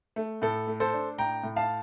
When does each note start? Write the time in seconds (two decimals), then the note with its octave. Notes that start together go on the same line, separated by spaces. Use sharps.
0.16 A3
0.42 A2 A4
0.67 A3
0.80 A4 C5
0.93 D4
1.18 A2 G5 A#5
1.43 A2
1.56 F5 A5